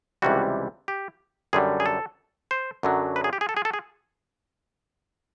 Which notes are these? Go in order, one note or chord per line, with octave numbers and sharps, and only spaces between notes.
C#2 C3 E3 G3 F#4
G4
F#2 D3 G3 G#4
G#4
A4
C5
F#2 D3 F#3
B4
G#4
G4
G#4
A4
G#4
A4
G#4